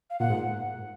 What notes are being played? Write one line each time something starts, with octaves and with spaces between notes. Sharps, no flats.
F5
A#2 F#5
G#2